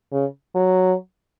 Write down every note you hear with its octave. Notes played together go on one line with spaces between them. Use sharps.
C#3
F#3